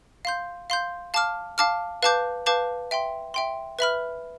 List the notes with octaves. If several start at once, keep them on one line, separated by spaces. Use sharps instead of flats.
F5 C6 G6
F5 C6 G6
F5 A5 D6 F6
F5 A5 D6 F6
B4 F5 A5 D6 G6
B4 F5 A5 D6 G6
E5 G5 C6
E5 G5 C6
B4 E5 B5 F6